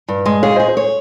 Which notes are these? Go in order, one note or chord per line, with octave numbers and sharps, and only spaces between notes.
G2
G#3
G#4 C#5 F5
G#4 C5 D#5
C5
C#5